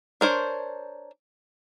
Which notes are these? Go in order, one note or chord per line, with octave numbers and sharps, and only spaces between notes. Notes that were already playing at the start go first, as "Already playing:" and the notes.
D4 A#4 C5 C#5